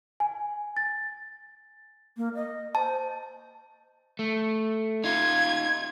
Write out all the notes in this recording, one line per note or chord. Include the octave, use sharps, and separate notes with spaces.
G#5
A6
A#3
D#5
C5 A5
A3
D#4 F4 G#6